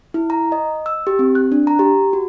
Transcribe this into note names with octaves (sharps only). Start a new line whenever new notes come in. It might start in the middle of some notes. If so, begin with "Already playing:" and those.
E4
A#5
D#5
E6
G4
C4
F#6
D4
A#5
G4
F#4